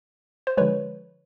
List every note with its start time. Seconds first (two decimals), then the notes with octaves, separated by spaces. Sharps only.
0.47 C5
0.57 D3 F3 G#3 B4 C#5